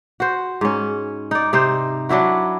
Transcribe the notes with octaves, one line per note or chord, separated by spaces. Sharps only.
F#4 C5
G#2 C#4
D#4 D5
C3 D#4 C5
F#3 D4 E4 F#4